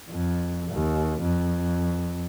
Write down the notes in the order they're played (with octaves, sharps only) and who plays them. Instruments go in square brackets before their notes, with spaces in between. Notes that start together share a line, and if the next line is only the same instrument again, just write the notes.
[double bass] F2
D#2
F2